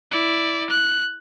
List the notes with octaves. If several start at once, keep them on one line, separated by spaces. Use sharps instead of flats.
E4 D5
F#6